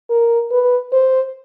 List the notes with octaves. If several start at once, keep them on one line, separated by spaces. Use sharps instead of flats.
A#4
B4
C5